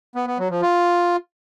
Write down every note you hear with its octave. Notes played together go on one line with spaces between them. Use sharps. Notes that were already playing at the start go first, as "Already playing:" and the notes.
B3
B3
F#3
F3
F4